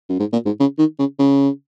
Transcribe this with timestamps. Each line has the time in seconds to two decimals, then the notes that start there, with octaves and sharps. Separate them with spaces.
0.09 F#2
0.19 G#2
0.32 A#2
0.46 G#2
0.60 C#3
0.78 D#3
0.99 C#3
1.19 C#3